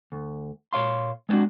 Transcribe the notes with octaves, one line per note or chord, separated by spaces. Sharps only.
D2
A#2 C#5 F5 C6
G#3 B3 C4 D4 F#4